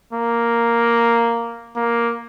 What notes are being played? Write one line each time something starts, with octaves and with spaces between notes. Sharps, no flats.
A#3
A#3